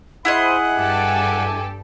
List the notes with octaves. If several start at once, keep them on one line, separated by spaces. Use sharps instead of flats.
E4 G#4 C5 D#5 F#5 B5
G2 G4 A4 G5 G#5 D6